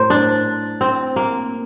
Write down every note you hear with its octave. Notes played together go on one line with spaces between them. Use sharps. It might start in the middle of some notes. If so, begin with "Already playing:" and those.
Already playing: A2 A#4 C5
D4
C4
A#3